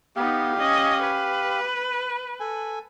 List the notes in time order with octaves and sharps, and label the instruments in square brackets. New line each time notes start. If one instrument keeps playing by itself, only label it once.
[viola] B3 D#4 [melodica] G4 F5
[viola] C#4 D#5
B4
[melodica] A4 G#5